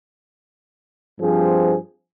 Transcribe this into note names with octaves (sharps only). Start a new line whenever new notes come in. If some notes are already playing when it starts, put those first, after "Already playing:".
G2 F3 C4 G#4